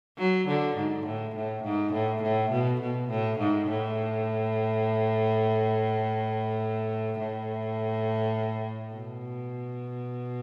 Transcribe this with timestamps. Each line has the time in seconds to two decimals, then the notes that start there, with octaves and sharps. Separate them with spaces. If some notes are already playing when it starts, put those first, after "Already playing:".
0.18 F#3
0.47 D3
0.76 G#2
1.05 A2
1.35 A2
1.64 G#2
1.93 A2
2.23 A2
2.51 B2
2.81 B2
3.10 A2
3.39 G#2
3.68 A2
7.19 A2
8.93 B2